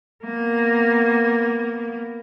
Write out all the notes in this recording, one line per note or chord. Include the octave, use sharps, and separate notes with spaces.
A#3 B3